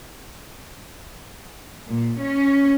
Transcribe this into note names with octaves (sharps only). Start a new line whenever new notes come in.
A#2
C#4